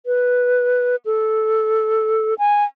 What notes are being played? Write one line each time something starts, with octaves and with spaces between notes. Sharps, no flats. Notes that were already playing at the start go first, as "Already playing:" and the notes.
B4
A4
G#5